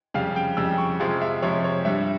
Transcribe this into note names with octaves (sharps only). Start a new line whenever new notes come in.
F2 C#3 G3 F5
G5
F2 C#3 G3 E6
C#6
F2 C3 F3 G#3 F5
E5
F2 C3 F3 G#3 C#5
C#5
G2 G3 E5